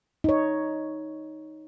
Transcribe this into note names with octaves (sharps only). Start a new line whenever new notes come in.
D#4 C#5